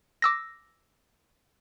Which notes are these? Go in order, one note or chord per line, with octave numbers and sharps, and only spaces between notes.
D6 E6 A#6